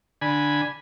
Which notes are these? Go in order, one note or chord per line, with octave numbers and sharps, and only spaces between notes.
D3 G#5 B5